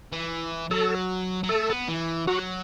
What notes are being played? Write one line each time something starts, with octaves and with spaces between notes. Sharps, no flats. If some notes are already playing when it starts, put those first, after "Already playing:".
E3
F#3 A4
F#3
A3 A4
B3
E3
F#3 F#4